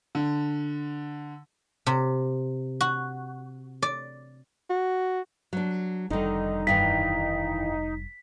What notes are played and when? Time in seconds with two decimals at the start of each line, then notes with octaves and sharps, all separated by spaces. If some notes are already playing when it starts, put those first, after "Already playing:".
0.15 D3
1.86 C3
2.81 F#4
3.82 D5
4.70 F#4
5.53 F#3 D4
6.10 F1 D3 D#3 G3 D#4
6.67 G2 D#3 E3 B6